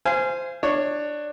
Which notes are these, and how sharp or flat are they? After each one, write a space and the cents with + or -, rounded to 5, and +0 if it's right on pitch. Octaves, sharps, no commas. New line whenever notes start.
C5 -10 F5 -30 G#5 +0
D4 +15 C#5 +0